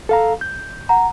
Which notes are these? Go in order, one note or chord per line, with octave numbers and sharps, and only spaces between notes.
A4 F5 A#5
G6
F#5 A#5